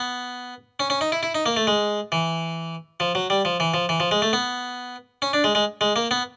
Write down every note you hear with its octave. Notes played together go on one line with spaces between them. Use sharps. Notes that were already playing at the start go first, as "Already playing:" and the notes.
Already playing: B3
C#4
C#4
D#4
E4
E4
D#4
A#3
A3
G#3
E3
F3
F#3
G3
F3
E3
F3
E3
F3
G#3
A3
B3
C#4
D4
G#3
G#3
G#3
A#3
B3